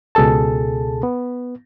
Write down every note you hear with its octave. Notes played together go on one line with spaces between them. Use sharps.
C#2 B2 G#4 A4 A5
B3